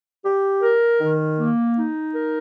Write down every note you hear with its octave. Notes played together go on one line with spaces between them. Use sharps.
G4
A#4
D#3
A#3
D#4
A#4